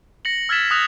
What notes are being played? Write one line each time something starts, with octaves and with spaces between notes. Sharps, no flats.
A#6 C#7 F#7
E6 F6 G#6 A6 B6 E7
D#6 F#6 A#6 F7